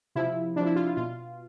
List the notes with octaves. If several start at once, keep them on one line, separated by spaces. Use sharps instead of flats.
C3 F3 E4
C3 F3 D4
E4
F4
F4
B2 F4